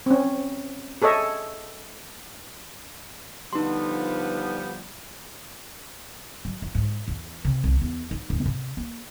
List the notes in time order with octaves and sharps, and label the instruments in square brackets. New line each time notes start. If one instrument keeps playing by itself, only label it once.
[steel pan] C4 C#4
G#4 A4 C#5 D#5 E5 G#5
[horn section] D3 F3 B3 [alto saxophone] G3 [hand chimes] D#4 C6
[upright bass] F#3
F2
G#2
E2
C3
C2
E2
D#4
D#1
C3
A#3